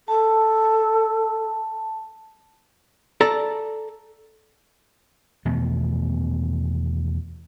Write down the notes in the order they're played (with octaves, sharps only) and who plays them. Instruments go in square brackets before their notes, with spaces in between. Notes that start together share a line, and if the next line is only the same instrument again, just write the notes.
[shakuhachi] A4 [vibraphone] A5
[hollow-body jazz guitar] A4 D5 A#5
[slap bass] E2 B2 D#3 A3